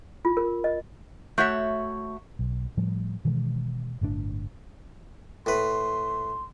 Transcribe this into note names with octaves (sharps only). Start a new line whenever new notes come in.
F4
A#4
D#5
A3 F#4 C#5 E5
B1
A2 F3 G3 A3
B2 D#3 E3 G#3
G1 A2 C3 D4
A2 B4 C6